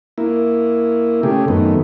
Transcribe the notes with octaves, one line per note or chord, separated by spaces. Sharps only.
A#3 E4
C#3 A3 G4 G#4
F#2 D#3 A3 B3